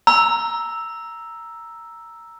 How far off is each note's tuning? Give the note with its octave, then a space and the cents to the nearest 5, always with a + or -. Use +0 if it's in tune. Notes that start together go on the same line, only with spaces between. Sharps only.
A#5 +0 E6 +0